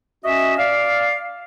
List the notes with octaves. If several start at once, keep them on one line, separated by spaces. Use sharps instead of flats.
C#4 F#4 D#5 E5
D5 F5